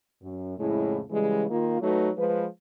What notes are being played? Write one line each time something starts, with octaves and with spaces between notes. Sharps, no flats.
F#2
F2 A2 C#3 G#3 E4
C#3 E3 G3 G#3
D#3 A#3 F4
F#3 A3 D#4 F#4 B4
F3 G#3 B4